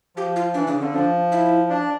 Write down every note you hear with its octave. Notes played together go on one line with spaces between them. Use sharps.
F3 G4
F4
E3 D4
C#3 D4
D3 C#4
F3 D4
E4
D4